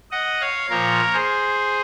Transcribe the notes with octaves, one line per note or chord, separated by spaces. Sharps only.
D#5 F#5
C#5 F5
A#2 F3 A#4 C#5
G#4 C5